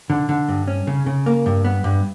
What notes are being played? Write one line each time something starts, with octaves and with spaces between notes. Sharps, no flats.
D3
D3
G2
C#4
C#3
C#3
A#3
G2
B3
G2